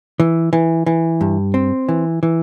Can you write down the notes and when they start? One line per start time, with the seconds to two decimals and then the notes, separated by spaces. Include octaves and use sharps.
0.20 E3
0.53 E3
0.86 E3
1.21 G2
1.54 C4
1.89 E3
2.23 E3